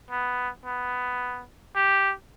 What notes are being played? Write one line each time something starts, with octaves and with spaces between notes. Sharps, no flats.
B3
B3
G4